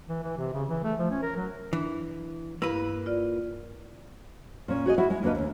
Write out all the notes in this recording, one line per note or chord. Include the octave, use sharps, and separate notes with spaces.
E3
E3
C3
C#3
E3
A3
F3
C#4
A#4
F#3
E3 D4
G2 A#3 E4 B4
F4 D5
A#2 C#4
F#4 G#4 C#5 D#5
E4 F#4 E5 F#5
G#3
C#3 A#3 D4 B4 D#5
D#2